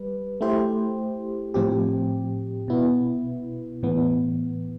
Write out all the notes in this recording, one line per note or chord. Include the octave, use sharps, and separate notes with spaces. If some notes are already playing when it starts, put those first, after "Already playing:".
Already playing: G3 B4
A3 E4 G4 C5
A2 F3 C4 G4
B2 B3 E4
A2 E3 B3